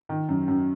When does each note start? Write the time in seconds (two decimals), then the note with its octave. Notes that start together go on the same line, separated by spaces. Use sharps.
0.09 D#3
0.29 F#2
0.48 F#2